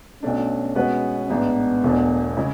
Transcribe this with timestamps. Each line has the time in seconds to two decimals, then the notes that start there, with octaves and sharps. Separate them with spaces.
0.22 B1 B2 A3 C#4 D4
0.76 B2 G#3 B3 F#4 B4
1.29 A1 G#2 G#3 B3 D4
1.83 E1 E2 B2 A3 D4
2.37 C#3 G#3 C#4 E4